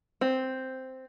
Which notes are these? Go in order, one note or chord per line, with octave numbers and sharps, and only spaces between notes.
C4